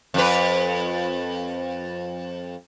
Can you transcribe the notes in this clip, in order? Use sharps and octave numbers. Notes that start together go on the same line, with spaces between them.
F2 B4